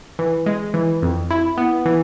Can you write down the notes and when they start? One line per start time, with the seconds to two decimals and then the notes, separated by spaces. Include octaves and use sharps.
0.19 E3
0.46 G#3
0.74 E3
1.02 F2
1.30 E4
1.57 B3
1.86 E3